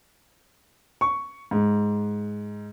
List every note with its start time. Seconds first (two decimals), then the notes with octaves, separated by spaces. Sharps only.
1.01 C#6
1.51 G#2